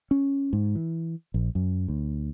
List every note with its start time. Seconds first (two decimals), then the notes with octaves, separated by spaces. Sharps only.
0.11 C#4
0.53 G#2
0.75 E3
1.34 A#1
1.55 F#2
1.88 D2